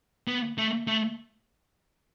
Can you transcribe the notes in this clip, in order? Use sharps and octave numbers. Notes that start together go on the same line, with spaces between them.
B3
A3
A3